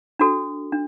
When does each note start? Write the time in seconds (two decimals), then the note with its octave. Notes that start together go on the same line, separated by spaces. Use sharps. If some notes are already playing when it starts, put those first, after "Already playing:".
0.19 D4 F#4 A4
0.72 D4